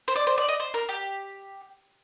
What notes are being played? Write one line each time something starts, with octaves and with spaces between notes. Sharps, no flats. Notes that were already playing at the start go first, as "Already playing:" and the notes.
C5
D5
C5
D5
D#5
C5
A#4
G4